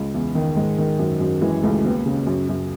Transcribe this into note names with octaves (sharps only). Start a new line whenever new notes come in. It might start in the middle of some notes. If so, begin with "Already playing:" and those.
Already playing: C#2
E2
D#3
G#2 G#3
D#3
F#2
F#2
E3 G#3
C#2 A3
D#2 B3
C#3
C#4
F#2 C#4
F#2